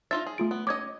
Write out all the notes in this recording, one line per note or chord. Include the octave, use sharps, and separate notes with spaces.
D#4 F4 E5 A6
G#4
A3 F4 D7
B3
C#4 D#5 D6 G#6